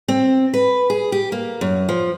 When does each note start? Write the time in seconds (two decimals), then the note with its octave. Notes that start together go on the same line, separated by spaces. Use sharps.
0.08 C4
0.54 B4
0.90 G#4
1.12 G4
1.32 A#3
1.61 F#2
1.89 F3